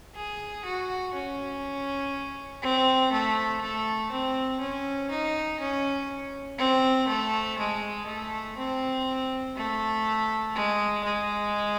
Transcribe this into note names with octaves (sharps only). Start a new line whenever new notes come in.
G#4
F#4
C#4
C4
A3
A3
C4
C#4
D#4
C#4
C4
A3
G#3
A3
C4
A3
G#3
G#3